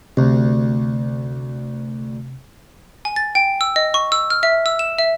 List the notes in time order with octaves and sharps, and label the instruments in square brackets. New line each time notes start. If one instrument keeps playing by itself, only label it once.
[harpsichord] D2 [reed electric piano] C3
[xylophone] G#5
A6
G5
E6
D#5
C#6
E6
F6
E5
E6
E7
E5